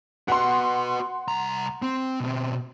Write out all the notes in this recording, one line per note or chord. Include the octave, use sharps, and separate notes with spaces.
F#4 B4 F#5 C6
C2 A#5
C4
B2 C4